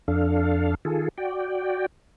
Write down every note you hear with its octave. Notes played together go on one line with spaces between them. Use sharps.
F2 D4 A4 F5
D#3 F4 G#4 A4
F#4 D5 G5